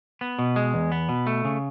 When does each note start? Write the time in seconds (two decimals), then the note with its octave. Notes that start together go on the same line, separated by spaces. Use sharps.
0.21 B3
0.39 B2
0.56 G#3
0.74 E2
0.92 B3
1.09 B2
1.27 A3
1.45 C#3